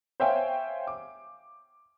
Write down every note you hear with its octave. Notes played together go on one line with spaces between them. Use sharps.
C5 C#5 E5 F5 G5 G#5
D6